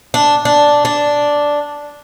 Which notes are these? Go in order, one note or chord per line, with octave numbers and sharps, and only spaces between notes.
D4
D4
D4